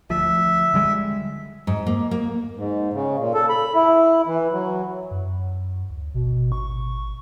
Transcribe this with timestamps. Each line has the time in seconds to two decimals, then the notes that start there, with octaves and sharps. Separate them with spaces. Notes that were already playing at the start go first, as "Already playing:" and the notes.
0.10 D2 F3 E5
0.74 D3 G3 G#3
1.67 G#2
1.87 A#3
2.11 A#3
2.57 G#2
2.93 C#3
3.19 A#2
3.34 A4
3.50 B5
3.75 E4
4.27 E3
4.53 F#3
5.11 F#2
5.90 D2
6.14 G#1 B2
6.52 C#6